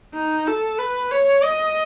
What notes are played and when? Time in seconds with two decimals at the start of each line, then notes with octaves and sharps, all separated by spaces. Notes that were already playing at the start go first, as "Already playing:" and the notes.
0.14 D#4
0.47 A4
0.78 B4
1.11 C#5
1.43 D#5